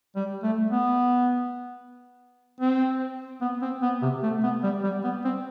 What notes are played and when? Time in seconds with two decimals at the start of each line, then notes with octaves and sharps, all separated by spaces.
0.16 G3
0.43 A3
0.71 B3
2.60 C4
3.41 B3
3.62 C4
3.82 B3
4.02 C3
4.23 A3
4.43 B3
4.63 G3
4.83 G3
5.04 B3
5.24 C4